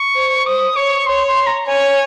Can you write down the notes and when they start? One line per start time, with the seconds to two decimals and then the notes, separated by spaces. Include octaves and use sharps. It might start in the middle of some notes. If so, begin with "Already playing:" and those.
Already playing: C#6
0.15 C5
0.45 C5 D#6
0.76 C#5 C#6
1.06 C#5 C6
1.27 C6
1.46 A#5
1.67 C#5 G#5